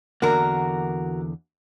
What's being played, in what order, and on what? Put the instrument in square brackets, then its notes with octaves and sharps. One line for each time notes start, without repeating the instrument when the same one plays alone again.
[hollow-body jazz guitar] E2 D3 A#3 [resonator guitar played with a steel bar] F#4 A#4